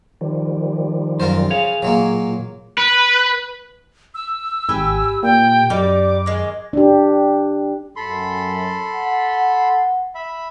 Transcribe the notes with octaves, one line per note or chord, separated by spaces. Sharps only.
D#3 F3 G3
F#2 F4 A#4 C5
G#4 C#5 F5
A#2 F#3 G#3 A#3
B4
E6
G#1 G4 B4 G#5
A#2 G5
F#2 G3 D#4 D5 D6
D#3 G#3
D4 G4
F#2 A4 B5 C6
F#5
E5 B5